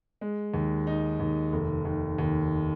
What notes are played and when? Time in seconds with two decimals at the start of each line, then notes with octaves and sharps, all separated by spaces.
0.21 G#3
0.54 D#2
0.87 D#4
1.20 D#2
1.53 F1
1.85 D#2
2.19 D#2